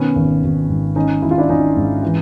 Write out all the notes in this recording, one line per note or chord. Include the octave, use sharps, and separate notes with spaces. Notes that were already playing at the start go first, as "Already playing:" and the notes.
Already playing: B2 D#3 B3 C#4
G#1
G#1
G#2
D#3 C#4 D#4
G#1 E4
F4
D4 E4
G#1 C#4 D#4
G#2
E3